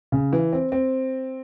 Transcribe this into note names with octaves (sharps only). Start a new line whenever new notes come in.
C#3
E3
C4
C4